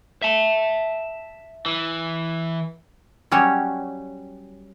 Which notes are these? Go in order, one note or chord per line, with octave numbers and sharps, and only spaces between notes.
E5 A5
E3
F#3 G3 C#4 G4 C#5